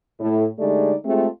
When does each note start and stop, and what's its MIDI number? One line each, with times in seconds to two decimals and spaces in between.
0.20 0.47 45
0.59 0.93 50
0.59 0.93 56
0.59 0.93 57
0.59 0.93 63
0.59 0.93 67
0.59 0.93 74
1.05 1.26 56
1.05 1.26 57
1.05 1.26 60
1.05 1.26 65
1.05 1.26 67
1.05 1.26 68